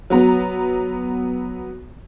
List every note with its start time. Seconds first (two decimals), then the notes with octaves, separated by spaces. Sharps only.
0.10 F#3 B3 A#5